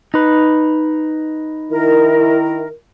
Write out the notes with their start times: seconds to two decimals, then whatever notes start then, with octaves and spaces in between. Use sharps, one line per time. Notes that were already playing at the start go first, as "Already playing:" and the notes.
0.14 D#4 B4
1.71 D#3 E4 A#4